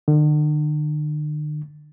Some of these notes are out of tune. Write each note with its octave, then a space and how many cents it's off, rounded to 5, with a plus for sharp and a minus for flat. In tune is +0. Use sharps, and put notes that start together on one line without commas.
D3 +45